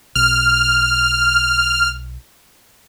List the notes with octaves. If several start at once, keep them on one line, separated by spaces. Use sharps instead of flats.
B1 F6